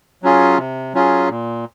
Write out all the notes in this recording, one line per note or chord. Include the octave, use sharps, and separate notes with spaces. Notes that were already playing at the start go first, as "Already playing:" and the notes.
F#3 C#4 F4 G#4
C3
F#3 C#4 F4 G#4
A#2